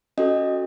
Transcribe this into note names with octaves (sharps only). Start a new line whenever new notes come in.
C#4 F#4 A4 D#5